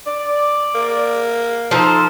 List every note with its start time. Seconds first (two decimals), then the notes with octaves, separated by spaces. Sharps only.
0.06 D5
0.75 A#3
1.71 F3 D#4 A4 C5